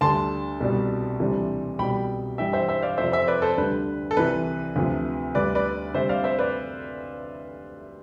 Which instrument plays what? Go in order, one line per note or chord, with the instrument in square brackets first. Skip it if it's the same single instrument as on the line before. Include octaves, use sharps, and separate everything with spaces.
[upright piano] D2 D3 G3 A5 C6
C2 B2 G3
D2 C3 E3 G3
C2 B2 G3 G5 B5
G2 E3 G3 E5 G5
C5 E5
C5 E5
D5 F5
F2 C3 F3 C5 E5
C5 E5
B4 D5
A4 C5
D2 D3 G3 B4
A4
C2 C3 E3 B4
D2 C3 F3
D2 D3 G3 B4 D5
B4 D5
D2 C3 G3 C5 E5
D5 F5
C5 E5
B4 D5